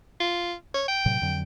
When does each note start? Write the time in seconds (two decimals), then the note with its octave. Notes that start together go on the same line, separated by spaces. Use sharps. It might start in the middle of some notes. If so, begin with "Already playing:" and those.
0.20 F4
0.74 C#5
0.88 G5
1.06 A2 C3 F#3
1.22 F2 D3 F#3